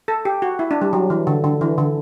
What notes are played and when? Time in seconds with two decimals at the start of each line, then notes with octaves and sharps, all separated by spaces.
0.08 A4
0.25 G4
0.42 F#4
0.59 E4
0.71 D4
0.81 G3
0.93 F#3
1.10 E3
1.27 D3
1.44 D3
1.61 E3
1.78 D3